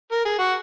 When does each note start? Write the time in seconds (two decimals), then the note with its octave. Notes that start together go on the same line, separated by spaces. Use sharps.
0.12 A#4
0.25 G#4
0.39 F#4